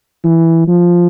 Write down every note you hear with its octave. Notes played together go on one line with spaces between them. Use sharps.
E3
F3